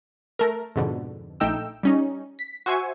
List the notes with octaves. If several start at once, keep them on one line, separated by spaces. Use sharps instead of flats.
A3 A#4
F2 G#2 B2 D3
A#1 A3 D#4 G5 E6
G3 C#4 D#4
B6
F#4 C5 E5 G#5 C#6